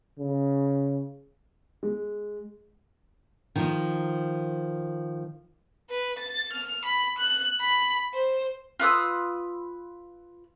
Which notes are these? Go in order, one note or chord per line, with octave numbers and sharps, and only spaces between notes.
C#3
G#3
D#3 F3 D#4
B4
A6
F6
B5
F#6
B5
C5
F4 B4 D#6 E6